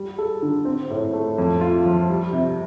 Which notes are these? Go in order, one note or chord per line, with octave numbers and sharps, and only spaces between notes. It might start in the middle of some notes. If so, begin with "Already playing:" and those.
Already playing: G3
A4
D3
C4
A2
A3
F2
F4
F3
G3
C3